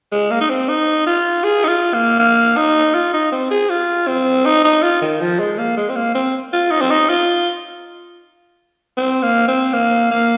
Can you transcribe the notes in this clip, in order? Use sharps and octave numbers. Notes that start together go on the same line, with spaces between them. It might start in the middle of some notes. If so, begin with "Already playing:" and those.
G#3
A#3
D#4
C4
D#4
F4
G#4
D#4
F4
A#3
A#3
D#4
F4
D#4
C4
G#4
F4
C4
D#4
D#4
F4
D#3
F3
G#3
A#3
G#3
C4
A#3
C4
F4
D#4
C4
D#4
F4
C4
A#3
C4
A#3
A#3